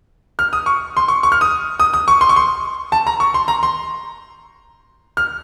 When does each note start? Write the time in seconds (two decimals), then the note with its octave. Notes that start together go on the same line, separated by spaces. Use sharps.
0.39 F6
0.53 D#6
0.66 C#6
0.97 C6
1.08 C#6
1.23 C#6
1.32 F6
1.41 D#6
1.80 D#6
1.94 D#6
2.08 C#6
2.21 C6
2.29 C#6
2.36 C6
2.92 A5
3.07 A#5
3.20 C#6
3.34 C6
3.48 A#5
3.63 C6
5.17 F6